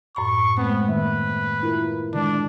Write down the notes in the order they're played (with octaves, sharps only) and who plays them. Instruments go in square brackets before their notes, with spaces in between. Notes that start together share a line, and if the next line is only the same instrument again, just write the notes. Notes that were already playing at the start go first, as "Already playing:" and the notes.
[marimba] F#2 A2 B5 [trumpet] C#6
[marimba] G#3 A3 [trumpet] B3 [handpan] C4
[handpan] D#3 A#3 E5 [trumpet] B4
[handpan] E4 F4 A#4
[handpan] D3 D#3 G#3 [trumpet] D4